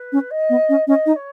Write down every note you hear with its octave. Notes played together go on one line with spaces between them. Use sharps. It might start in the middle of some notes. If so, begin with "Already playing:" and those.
Already playing: B4
C#4
D#5
B3
C#4
C#4 D#5
D#4
C#5